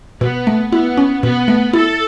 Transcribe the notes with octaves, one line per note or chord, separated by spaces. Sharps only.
B2 B3
A3
B3 E4
C#4
B2 B3
A3
E4 A4